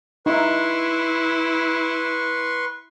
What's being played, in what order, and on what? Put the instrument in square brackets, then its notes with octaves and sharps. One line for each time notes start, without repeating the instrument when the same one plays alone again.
[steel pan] D#4 E5 [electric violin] E4 [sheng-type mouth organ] B4 C6 C#6